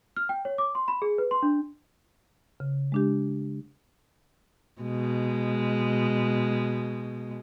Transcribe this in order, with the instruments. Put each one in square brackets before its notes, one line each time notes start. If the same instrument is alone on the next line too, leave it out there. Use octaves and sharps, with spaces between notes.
[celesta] F6
G5
C#5
D6
C6
B5
G#4
B4
C6
D4
[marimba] C#3
G#3 D4 G4
[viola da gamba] B2 G#3